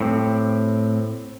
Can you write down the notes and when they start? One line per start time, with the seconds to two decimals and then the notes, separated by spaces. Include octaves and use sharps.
0.01 A2 C4 G4